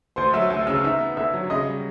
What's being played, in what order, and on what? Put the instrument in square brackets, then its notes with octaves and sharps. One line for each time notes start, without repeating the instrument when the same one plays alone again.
[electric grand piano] D2 [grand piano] C5 C6
[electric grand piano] F#3 [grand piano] E5 E6
[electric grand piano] D2 [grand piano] E5 E6
[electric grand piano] C#3 [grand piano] E6
[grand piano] F6
[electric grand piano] D#4 [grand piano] E5 E6
[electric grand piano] B3
[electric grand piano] D3 [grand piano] E5 E6
[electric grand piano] F#3
[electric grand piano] C#3 [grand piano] D#5 D#6
[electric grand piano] G3